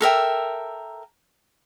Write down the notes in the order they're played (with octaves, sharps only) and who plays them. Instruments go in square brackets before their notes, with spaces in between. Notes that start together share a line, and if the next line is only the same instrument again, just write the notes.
[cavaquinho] A4 A#4 E5 G5